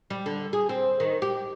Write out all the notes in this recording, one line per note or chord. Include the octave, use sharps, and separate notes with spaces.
G3
D3
G#4
C4
D#3
G4